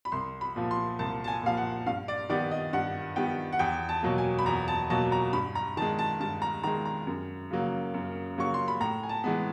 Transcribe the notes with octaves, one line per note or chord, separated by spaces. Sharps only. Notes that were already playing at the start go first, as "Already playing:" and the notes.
B5
C2 C6
B5
A#2 F3
C6
C2 A5
A5
G#5
A#2 F3 F5
F#5
G2 F5
D5
D#3 G3 B3 D5
D#5
G2 F#5
D#3 G3 B3 G5
F#5
E2 G5
A5
B2 F#3 A#3
G#5
B5
E2 A#5
A5
B2 F#3 A#3 A5
A#5
G2 B5
A#5
D#3 G#3 A5
A5
G2 A5
A#5
D#3 G#3 A#5
A#5
F#2
C#3 F#3 A#3
F#2
C#3 F#3 A#3 C#6
C6
B5
A2 A#5
G#5
A5
E3 G#3 B3